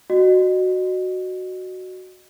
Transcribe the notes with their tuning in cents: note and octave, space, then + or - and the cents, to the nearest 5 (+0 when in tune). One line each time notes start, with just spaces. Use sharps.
F#4 +0 D#5 -30